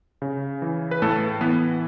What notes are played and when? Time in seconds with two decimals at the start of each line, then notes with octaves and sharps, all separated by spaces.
0.22 C#3
0.62 E3
0.91 B4
1.02 A2 A3 A4
1.41 E3 B3 B4